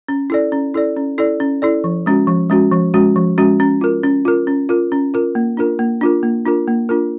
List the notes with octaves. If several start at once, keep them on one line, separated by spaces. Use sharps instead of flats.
C#4
E4 A4 D5
C#4
E4 A4 D5
C#4
E4 A4 D5
C#4
E4 A4 D5
F3
G#3 C#4 F#4
F3
G#3 C#4 F#4
F3
G#3 C#4 F#4
F3
G#3 C#4 F#4
C#4
F4 A#4
C#4
F4 A#4
C#4
F4 A#4
C#4
F4 A#4
A#3
D4 F4 A#4
A#3
D4 F4 A#4
A#3
D4 F4 A#4
A#3
D4 F4 A#4